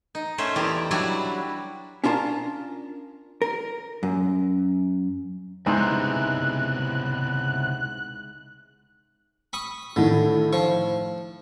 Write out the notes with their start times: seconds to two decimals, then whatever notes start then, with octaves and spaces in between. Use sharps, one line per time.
0.15 D#4
0.38 A3 C#4 C5 E5
0.56 E2 G4 D5 A#5
0.91 F#3 G3 D4 E4 F#4
2.04 C#4 D4 F4 A#4 A5
3.42 A#4
4.03 F#2
5.66 C#2 C3 G#3 B3 D#4 E4 C5 F#6
9.53 B5 C#6 D#6
9.96 A2 D3 D#3
10.53 F3 C#6